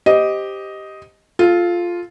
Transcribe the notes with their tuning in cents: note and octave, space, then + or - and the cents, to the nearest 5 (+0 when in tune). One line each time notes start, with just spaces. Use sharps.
G4 +0 C5 +0 D#5 +5
F4 +0 A4 -25